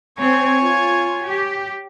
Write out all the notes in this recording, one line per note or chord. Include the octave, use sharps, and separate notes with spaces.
C4 C#5 G#5
F4
G4